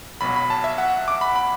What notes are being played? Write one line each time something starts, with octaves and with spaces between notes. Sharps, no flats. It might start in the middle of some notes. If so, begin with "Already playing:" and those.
B1 B2 F#3 B5
B5
A5
E5
F#5
D6
B5
B5